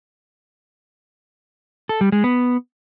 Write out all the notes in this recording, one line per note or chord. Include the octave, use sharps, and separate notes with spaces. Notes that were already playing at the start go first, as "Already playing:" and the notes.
A4
G3
G#3
B3